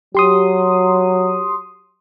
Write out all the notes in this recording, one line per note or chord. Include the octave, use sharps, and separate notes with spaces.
F#3 G4 C6 D#6